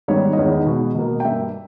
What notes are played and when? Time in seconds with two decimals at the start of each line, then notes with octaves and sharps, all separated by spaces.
0.08 G#2 D#3 G3 B3 C#5
0.33 D#5
0.37 E2 D#3 G#3 B3 C#5
0.52 D#5
0.66 B2 G#3 B3
0.95 B2 A#3
1.20 G5
1.24 G2 G3 A#3 E5